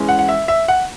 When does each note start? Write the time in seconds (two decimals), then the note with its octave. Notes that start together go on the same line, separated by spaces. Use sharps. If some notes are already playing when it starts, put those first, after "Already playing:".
Already playing: E3 G#3 C#4
0.09 F#5
0.19 F#5
0.29 E5
0.48 E5
0.68 F#5